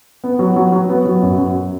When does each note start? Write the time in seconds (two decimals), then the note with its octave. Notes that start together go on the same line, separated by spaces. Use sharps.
0.24 B3
0.39 F#3
0.56 F#3
0.72 F#3
0.89 B3
1.06 F#3
1.22 F#2
1.39 F#2